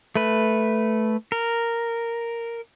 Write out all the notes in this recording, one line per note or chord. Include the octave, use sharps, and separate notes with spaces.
A3 B4
A#4